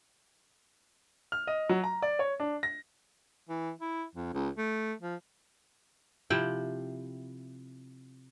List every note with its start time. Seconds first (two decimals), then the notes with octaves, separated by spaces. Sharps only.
1.32 F6
1.47 D#5
1.69 F#3
1.84 A#5
2.02 D5
2.19 C#5
2.40 D4
2.63 A#6
3.49 E3
3.81 E4
4.15 F2
4.33 C#2
4.58 A3
5.02 F3
6.30 C3 F3 E4 G5